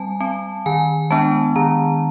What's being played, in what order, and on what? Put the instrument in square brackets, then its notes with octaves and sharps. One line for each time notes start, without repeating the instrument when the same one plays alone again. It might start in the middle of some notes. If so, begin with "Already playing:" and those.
Already playing: [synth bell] G3 C4 G#5 A5
C4 A5
D#3 G#5
G#3 B3 D4 A5
D#3 A#5